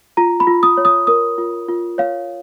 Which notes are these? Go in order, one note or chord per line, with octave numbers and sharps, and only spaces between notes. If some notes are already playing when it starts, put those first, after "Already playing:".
F4 A#5
B5
F4
D#6
C#5
D#6
A#4 D#6
F4
F4
C#5 F5